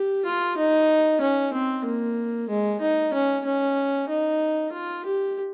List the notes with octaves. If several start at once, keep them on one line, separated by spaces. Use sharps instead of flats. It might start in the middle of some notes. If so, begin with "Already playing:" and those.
Already playing: G4
F4
D#4
C#4
C4
A#3
G#3
D#4
C#4
C#4
D#4
F4
G4